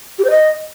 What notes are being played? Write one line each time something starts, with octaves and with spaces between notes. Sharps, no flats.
G4
C5
D#5